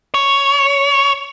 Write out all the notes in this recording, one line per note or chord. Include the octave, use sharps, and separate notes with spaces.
C#5